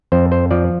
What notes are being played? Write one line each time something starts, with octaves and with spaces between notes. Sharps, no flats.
F2 C5
C5
F3 D5